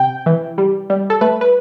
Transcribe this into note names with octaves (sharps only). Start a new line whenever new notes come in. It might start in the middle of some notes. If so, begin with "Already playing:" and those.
Already playing: C3 G5
E3
G3
G3
A4
A3 B4
B4